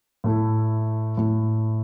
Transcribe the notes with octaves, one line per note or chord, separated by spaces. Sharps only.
A2 A3 E4
A2 A3 E4